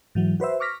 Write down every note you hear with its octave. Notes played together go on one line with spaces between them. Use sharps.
G#2 E3 F#3
F#4 B4 C5 E5
C#6 D6 F6 A#6 B6